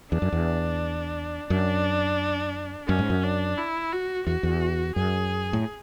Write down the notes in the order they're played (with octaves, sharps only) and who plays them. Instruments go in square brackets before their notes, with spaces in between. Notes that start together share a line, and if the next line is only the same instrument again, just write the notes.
[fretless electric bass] E2 [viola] D4
[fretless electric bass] F#2
E2
[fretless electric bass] F#2 [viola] D4
[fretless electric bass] F#2 [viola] C#4
[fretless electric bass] G#2
F#2
[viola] D4
E4
F#4
[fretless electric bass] E2 [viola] F#4
[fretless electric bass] E2
[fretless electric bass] F#2 [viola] G#4
[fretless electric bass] A2